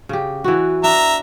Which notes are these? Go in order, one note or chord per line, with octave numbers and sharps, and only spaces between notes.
C#3 G4
E3 B3 F#4
D4 E5 A#5